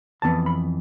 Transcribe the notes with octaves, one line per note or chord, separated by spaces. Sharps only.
F2 E3 B3 A5
B5